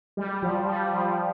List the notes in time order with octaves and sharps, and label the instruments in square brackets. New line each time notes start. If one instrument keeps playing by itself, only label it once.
[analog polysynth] G3
F3
G3
F3